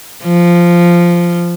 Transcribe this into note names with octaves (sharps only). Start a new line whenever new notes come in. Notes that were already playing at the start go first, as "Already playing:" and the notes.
F3